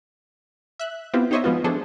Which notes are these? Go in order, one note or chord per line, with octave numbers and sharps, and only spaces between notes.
E5 F#6
B3 C4 E4 F4 G4
D#4 G4 C5 C#5 D#5 E5
F3 G#3 B3 F4 F#4
F3 D4 G#4 A4 C5